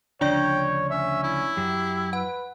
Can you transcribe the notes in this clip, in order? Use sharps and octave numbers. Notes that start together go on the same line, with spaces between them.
D2 C#3 F3 D4 C#5 D5 G5 C#6
C#4 E5
E4
F#2 F#3 G4
B4 F#5